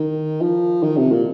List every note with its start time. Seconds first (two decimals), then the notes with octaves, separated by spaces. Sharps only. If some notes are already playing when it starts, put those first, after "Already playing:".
Already playing: D#3
0.41 F3
0.83 D#3
0.97 C3
1.12 A#2